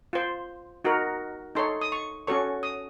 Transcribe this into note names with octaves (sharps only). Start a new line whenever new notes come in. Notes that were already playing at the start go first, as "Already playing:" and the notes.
F4 C5
D#4 F#4 A#4
D#4 A4 C#5 C6
D#6
C#6
C#4 F#4 A4 C#5 C#6
D#6